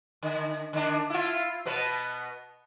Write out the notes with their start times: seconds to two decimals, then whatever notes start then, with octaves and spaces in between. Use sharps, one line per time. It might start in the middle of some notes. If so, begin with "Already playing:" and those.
0.22 D3
0.73 D3 D4
1.10 E4 F4
1.66 B2 B3 B4